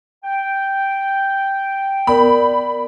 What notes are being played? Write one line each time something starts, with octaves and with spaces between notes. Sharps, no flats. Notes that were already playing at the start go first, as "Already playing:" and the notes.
G5
B3 A#4 D5 B5